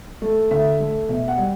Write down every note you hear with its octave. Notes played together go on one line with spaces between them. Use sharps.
A3
D3 E5
A3
B2 E5
F#5
G3